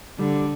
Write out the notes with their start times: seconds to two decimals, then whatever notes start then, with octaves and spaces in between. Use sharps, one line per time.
0.19 D3 G3